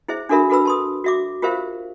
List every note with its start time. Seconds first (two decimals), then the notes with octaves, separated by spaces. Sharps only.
0.08 E4 G#4 C5 E5
0.29 D4 F#4 A4 A#4 E5 B5
0.50 F#4 A4 B4 B5 E6
0.65 A5 C6 D#6
1.04 F#4 E5 D6
1.42 F4 G4 A#4 C5 E5 F5